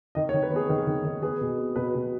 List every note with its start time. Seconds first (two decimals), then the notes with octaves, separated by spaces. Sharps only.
0.15 D#3 D#5
0.29 C#5
0.34 D#3
0.43 B4
0.51 B3 G#4
0.69 D#3
0.87 D#3
1.05 D#3
1.22 B3 G#4
1.41 B2
1.58 B3
1.76 B2 B4
1.95 B2